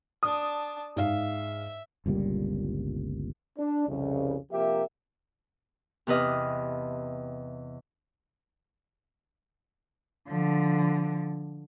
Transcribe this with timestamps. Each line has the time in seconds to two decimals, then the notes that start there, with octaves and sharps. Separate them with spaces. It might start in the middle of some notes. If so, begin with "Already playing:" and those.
0.23 D4 A5 D#6
0.96 G#2 E5 F5
2.06 G1 C#2 A#2 G3
3.58 D4
3.88 C2 F2 C#3
4.52 C3 F3 A#3 G4 A#4 E5
6.07 E2 C3 B4 D#5 F6
10.27 D3 F3